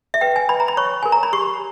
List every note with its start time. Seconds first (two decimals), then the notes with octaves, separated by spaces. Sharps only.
0.14 E5
0.21 B4 G5
0.36 G#5
0.49 B4 B5
0.60 A#5
0.68 B5
0.77 C#5 C#6
1.03 A#4 G#5
1.12 A#5
1.23 B5
1.33 G4 C#6